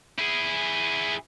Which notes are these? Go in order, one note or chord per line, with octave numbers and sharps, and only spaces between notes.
E4 G#4